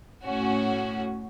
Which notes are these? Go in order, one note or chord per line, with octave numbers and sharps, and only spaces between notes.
A2 C#4 F#4